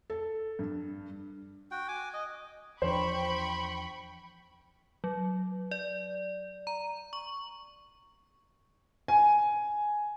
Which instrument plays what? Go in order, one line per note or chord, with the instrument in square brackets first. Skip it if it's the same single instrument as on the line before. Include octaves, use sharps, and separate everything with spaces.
[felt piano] A4
G2
[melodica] F#4 G5
G#5 D6
D#5
[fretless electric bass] E2 F3 D4 [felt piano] C5 [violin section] G5 B5 C#6
[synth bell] F#3
D5
A#5
C#6
[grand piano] G#5